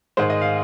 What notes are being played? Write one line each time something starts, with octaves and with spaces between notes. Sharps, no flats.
G#2 D#3 G#3 C5
D#5
F5